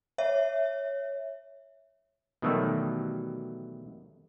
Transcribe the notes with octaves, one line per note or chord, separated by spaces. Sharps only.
C#5 E5
B2 D#3 E3 F#3 G3 A3